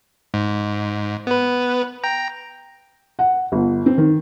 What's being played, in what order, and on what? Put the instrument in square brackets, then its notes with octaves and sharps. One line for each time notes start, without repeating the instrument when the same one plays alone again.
[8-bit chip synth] G#2
B3 B4
G5 A#5
[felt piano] F#5
G1
C4
D#3